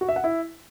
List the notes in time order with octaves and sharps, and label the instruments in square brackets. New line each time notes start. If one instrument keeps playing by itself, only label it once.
[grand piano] F#4
E5
F#5
E4